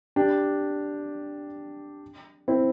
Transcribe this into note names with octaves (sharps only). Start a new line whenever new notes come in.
D4 G4
C4 E4